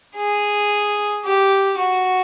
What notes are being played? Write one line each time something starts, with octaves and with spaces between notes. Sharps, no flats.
G#4
G4
F#4